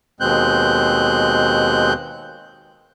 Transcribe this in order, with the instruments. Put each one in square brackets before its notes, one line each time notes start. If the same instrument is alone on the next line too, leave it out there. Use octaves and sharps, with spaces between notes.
[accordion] D#2 B2 G#3 C4 F#6 G6